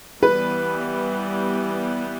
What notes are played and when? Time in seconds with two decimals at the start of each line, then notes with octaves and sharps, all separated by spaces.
0.23 E3 G3 B3 B4